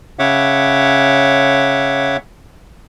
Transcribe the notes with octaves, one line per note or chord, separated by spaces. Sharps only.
C#3 C#5 E5 F#5 D6